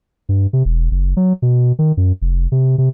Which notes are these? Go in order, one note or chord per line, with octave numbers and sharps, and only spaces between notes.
G2
C3
E1
F#1
F#3
B2
D#3
F#2
F1
C3
C3